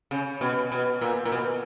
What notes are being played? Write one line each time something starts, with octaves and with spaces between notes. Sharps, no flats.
C#3
B2
B2
A#2
A#2
B2